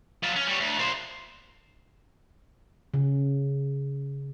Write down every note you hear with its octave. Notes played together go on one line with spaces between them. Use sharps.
F#3 F4
C#4
G3 C#5
D2
A#2 C5
C#3